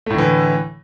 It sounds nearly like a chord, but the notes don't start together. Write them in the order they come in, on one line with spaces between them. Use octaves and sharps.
A3 A2 D3 E3